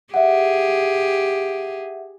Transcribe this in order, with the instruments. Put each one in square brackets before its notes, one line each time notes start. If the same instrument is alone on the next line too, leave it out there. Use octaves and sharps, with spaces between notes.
[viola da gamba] G4 G#4 [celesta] E5 F#5